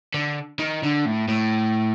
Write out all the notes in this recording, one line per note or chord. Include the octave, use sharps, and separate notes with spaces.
D3
D#3
D3
A2
A2